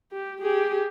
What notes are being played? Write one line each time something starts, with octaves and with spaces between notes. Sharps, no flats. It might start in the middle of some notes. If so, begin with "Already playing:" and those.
G4
G4 G#4